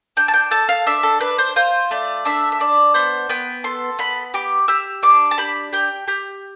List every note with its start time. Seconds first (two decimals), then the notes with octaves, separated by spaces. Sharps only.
0.17 D4 G5
0.28 A5
0.34 G5
0.51 A4 A5
0.69 F5
0.86 D4 E5
1.03 A4
1.20 D4 B4
1.38 C5
1.56 F4 C5
1.91 A3 D5
2.25 D4 E5
2.52 E5
2.60 D4 D5
2.94 B3 C5
3.29 B3 G5
3.64 A4 C6
3.99 B3 B5
4.34 G4 D6
4.68 G4 E6
5.03 D4 D6
5.31 A5
5.38 G4 B5
5.72 G4 G5
6.08 G4